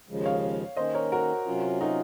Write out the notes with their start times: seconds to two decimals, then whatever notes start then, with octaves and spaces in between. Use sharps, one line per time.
0.09 D#2 C#3 F3 G#3
0.25 C#5 F5
0.77 D#3 A#3 C#4 C5 D#5
0.94 A#4 C#5
1.12 F#4 A#4
1.46 C3 F#3 C#4 F4
1.80 D#4 F#4